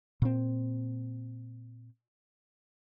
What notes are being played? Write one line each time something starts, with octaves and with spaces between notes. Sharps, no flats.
A#2 C4